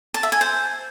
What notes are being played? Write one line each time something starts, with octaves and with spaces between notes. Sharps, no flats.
A5
E5
G#5
C5